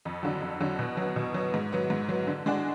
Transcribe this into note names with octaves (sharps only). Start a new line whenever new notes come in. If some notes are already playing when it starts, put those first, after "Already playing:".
F2
D3 F#3
F2
D3 F#3
B2
F#3 B3
B2
F#3 B3
G#2
F#3 B3
G#2
F#3 B3
D3
G#3 D4 F#4